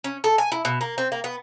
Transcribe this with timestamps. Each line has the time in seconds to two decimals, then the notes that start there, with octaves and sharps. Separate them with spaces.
0.04 C#4
0.24 A4
0.38 G#5
0.52 E4
0.65 B2
0.81 A#3
0.98 C4
1.12 A#3
1.24 B3